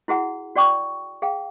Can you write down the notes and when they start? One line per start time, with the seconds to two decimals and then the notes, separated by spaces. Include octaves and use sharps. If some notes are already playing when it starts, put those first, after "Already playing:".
0.08 E4 F#4 G#4 F#5
0.56 F#4 D5 G5 C#6 D6
1.22 G#4 F5 G5